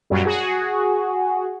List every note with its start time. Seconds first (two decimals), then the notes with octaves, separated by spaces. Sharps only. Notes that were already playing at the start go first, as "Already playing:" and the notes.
0.10 F#2 A#2 F#3 G3
0.26 F#4 G#4